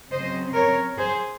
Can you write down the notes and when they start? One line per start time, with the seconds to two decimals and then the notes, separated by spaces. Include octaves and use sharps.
0.11 C#3 F#3 C4 C5 D#5
0.54 A#4 C#5
0.97 G#4 C5